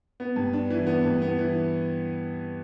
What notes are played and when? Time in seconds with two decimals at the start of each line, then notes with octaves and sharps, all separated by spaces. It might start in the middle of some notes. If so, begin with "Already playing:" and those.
0.20 B3
0.36 G2
0.53 D4
0.70 E3
0.87 B3
1.04 G2
1.22 B3
1.38 E3